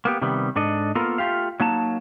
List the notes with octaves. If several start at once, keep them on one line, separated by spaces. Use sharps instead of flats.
A#3 B3 G4
C3 D#3 G3 B3
G#2 D4 A4 D#5
A#3 B3 F4 A4 A#4
A3 F4 G4 F5
F#3 A#3 D#4 A5